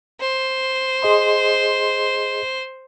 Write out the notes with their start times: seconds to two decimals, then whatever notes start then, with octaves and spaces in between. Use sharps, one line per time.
0.20 C5
1.03 G#4 D#5 C6